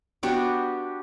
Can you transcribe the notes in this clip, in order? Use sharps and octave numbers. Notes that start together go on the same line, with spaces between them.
B3 D4 F#4 G4